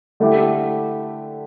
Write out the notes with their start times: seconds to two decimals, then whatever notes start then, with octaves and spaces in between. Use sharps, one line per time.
0.20 D3 A3 E4 G4